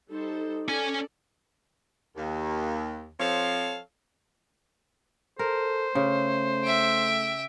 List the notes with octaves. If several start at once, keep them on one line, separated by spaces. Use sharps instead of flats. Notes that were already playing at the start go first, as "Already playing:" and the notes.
G3 D#4 A4 C5
C#4 A4 D5 G#5
D#2
F3 C4 A4 C#5 F5
A4 A#4 C5
C#3 A3
E5 G5